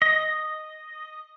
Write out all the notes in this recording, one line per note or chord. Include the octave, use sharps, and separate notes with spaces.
D#5